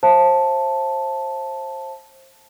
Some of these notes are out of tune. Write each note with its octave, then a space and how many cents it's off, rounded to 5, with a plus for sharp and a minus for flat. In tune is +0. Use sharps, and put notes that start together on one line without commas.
C5 +25 E5 +40 A5 +0